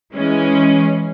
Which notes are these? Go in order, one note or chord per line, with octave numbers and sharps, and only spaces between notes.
E3 G#3 C#4